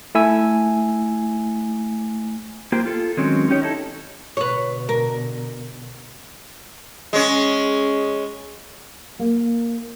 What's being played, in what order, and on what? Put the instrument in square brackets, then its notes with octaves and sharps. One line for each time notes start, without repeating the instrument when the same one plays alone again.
[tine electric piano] A3 E4 G#5 E6
[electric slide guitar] A#3 B3 F4 G4 C5
F4 A4
D#3 F#3 G#3 C4 C#4
C#4 D#4 G4 C#5
D#4 E4 A4
[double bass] B2 D3 [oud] B4 C#5
[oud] A#4
[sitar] G#3 C#4
[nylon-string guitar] A#3